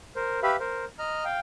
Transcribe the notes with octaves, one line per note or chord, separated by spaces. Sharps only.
A#4 C5
G4 B4 E5 F5 B5
A#4 C5
D#5 A#5 F6
F5 G5